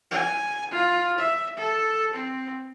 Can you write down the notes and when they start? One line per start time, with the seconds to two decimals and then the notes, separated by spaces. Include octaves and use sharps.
0.11 G#5
0.71 F4
1.18 E5
1.56 A4
2.13 C4